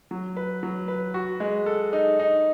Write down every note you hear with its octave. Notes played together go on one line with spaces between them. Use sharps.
F#3
B4
F#3
B4
F#4
G#3
A4
D#4
D#4